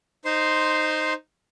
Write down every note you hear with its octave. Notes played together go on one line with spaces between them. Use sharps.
D#4 C5 C6